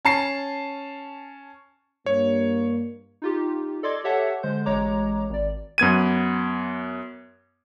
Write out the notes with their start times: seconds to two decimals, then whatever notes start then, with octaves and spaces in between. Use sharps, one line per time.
0.05 C#4 A5 C7
2.06 G2 A#3 C#5
3.22 D#4 F4 G4
3.83 A4 D5 D#5 C6 D6 G#6
4.04 G4 A4 C#5 E5 F#5 A5
4.43 D3 G#3 C5 G6
4.66 A1 G#3 C#5 A#5 D6
5.30 G#1 D5
5.78 F#2 B3 G#6 D#7